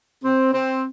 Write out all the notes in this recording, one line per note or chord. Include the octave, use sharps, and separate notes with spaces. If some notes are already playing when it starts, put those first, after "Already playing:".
C4
C4